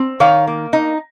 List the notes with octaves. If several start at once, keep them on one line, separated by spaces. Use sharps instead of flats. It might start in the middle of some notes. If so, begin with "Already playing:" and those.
Already playing: C4
D#3 C#5 F5
A#3
D#4